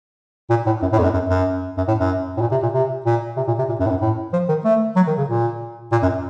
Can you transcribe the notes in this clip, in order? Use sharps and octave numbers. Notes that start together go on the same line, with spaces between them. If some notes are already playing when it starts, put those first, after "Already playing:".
A#2
A2
F#2
A2
F2
F#2
F#2
F#2
F#2
A2
F#2
A2
A#2
C3
A#2
C3
A#2
C3
A#2
C3
A#2
F#2
A2
F#2
A2
F3
D#3
A3
F#3
D#3
C#3
A#2
A#2
F#2